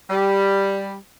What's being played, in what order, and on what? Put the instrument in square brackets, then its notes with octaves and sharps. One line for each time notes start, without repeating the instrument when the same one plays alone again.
[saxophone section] G3